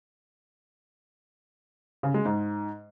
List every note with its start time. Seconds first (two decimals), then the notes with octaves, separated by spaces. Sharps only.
2.03 C#3
2.14 G#3
2.26 G#2